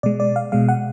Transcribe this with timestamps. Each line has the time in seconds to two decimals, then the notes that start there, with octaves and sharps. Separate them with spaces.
0.03 B2 G#3 D5
0.20 D5
0.36 F5
0.52 B2 G#3 F5
0.69 F#5